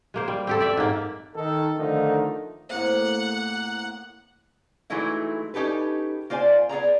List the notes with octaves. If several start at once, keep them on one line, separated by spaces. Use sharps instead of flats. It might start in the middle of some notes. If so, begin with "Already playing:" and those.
G#3 A#3 C5
G3
C4 G4 A4
D5 E5
G#2 A#3
D#3 A4
D3 D#3 F3 A3 D#4
A2 C3 A#3 F#5
E3 F#3 G#3 A3 D#4 E4
C#4 D#4 G4 A4 B4
A#3 F4 C5 D5 G#5
B3 G#4 D5 A#5